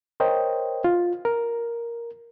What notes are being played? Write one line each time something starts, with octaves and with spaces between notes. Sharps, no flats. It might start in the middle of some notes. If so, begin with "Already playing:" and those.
A#4 C5 C#5 D#5 G5
F4
A#4